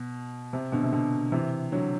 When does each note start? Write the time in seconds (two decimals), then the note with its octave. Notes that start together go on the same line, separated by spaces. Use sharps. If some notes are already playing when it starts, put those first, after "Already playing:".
Already playing: B2
0.53 C3
0.72 B2 D3
0.83 C3
0.92 B2 D3
1.32 C3 E3
1.72 D3 F#3